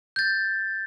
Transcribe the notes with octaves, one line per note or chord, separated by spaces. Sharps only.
G6 A6